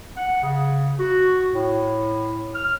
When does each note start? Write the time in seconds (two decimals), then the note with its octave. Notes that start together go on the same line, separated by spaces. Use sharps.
0.17 F#5
0.43 C#3
0.99 F#4
1.53 A2
2.56 F6